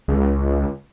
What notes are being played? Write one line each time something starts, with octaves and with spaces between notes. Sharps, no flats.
C#2